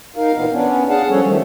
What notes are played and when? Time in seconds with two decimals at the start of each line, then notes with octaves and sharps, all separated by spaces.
0.16 D#4 A#4 F5
0.34 A#2 E3 A#3 B3 F5
0.51 B3 C#4 D4
0.89 G#4 F5 F#5 A5
1.09 F3 G3 C#4 A4 C#5
1.25 D#3 F3 G3 A3